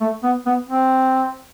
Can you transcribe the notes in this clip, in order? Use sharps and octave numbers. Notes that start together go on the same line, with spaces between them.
A3
B3
B3
C4